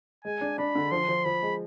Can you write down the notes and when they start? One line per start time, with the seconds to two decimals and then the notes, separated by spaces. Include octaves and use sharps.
0.25 G#3 G#5
0.41 D4
0.58 D4 B5
0.75 D3
0.92 F3 C6
1.09 F3
1.25 F3 B5
1.42 G#3